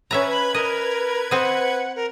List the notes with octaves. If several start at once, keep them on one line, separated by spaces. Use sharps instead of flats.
C#4 B4 E5 A#5 G#6
B5
A#4 D#5
C4 D#5 F#5
A#4